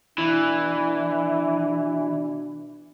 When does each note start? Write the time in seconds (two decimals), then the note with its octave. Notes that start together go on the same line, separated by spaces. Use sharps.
0.18 B2 E3 D4